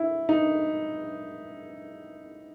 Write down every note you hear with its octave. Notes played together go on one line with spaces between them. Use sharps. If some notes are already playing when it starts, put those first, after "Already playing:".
Already playing: E4
D#4